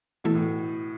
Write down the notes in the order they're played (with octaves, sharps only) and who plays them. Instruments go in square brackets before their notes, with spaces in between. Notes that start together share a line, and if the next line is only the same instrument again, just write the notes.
[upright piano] B2 [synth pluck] E3 A3 E4 A4
[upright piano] A2